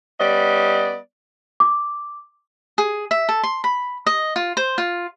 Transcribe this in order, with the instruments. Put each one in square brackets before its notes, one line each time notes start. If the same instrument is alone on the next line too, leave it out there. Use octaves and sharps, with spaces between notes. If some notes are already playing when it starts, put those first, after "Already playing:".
[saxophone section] G3 B3 C#4 D5 D#5
[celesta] D6
[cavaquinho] G#4
E5
A4
C6
B5
D#5
F4
C5
F4